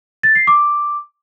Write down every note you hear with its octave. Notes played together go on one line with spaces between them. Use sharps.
A6
C7
D6